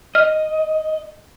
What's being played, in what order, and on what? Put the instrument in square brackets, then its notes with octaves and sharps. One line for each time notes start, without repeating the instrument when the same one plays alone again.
[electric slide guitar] D#5 [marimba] F6